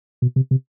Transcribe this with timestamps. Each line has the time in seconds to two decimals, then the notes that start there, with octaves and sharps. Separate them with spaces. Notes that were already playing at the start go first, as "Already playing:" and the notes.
0.22 B2
0.36 C3
0.51 C3